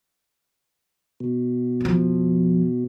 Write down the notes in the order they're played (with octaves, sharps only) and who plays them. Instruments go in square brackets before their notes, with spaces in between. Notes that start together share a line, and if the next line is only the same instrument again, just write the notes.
[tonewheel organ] B2
[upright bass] F2 F3